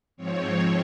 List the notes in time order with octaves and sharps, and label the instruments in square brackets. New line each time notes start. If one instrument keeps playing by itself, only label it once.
[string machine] G#2 F3 C4 C#5